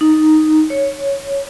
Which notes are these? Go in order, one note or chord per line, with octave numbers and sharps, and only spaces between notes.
D#4
C#5